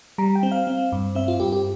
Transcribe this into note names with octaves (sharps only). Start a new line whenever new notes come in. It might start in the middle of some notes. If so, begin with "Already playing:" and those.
G3 A#5
G5
C4
F5
C4
G2
C4 E5
F4
G2 G4
G4